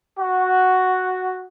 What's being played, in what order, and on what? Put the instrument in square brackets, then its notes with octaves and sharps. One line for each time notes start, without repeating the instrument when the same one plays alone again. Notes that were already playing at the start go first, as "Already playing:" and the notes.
[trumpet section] F#4